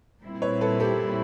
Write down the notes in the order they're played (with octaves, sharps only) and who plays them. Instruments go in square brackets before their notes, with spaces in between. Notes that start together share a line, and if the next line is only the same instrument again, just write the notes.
[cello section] A#2 G3 C4 E4
[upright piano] B4 C#5
A4 B4
G4 A4